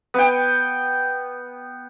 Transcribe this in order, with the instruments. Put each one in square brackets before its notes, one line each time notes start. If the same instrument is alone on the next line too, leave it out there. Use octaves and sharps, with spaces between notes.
[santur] B3 G5